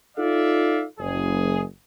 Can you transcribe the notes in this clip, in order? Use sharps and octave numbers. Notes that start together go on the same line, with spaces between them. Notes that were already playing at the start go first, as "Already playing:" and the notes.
D#4 F4 A4 D5 E5 F5
F#1 G#4